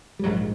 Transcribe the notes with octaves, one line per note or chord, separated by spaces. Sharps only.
G3
A#1 G#2 F#3